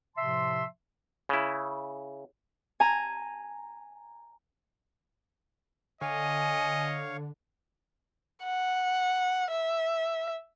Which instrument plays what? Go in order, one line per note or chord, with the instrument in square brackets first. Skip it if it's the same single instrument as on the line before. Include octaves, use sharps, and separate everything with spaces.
[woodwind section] A2 C3 F3 E5 A5 C6
[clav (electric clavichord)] C#3 E4
[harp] G#5 A#5
[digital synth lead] D3 [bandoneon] C#5 F5 C#6 [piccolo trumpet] D#5 [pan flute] G#5
[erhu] F#5
E5